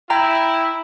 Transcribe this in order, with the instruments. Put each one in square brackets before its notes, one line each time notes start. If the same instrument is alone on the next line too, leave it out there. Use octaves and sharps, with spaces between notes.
[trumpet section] E4 [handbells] G5 A#5